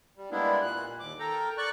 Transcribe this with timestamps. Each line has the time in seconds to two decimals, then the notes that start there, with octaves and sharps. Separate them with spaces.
0.17 G3
0.31 G3 G#3 A#3 B3 D4 E4
0.62 A#2 F#6
1.00 D#2 D6
1.19 A4 A#4 G5 A#5
1.58 D5 C#6 F#6